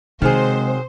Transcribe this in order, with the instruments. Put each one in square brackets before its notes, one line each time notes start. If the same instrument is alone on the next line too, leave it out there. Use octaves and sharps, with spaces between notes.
[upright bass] C3 [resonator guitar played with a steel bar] D#3 F#3 G#4 [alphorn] G#3 [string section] C5